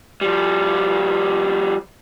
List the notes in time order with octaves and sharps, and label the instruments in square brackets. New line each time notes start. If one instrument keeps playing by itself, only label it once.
[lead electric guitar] F3 G3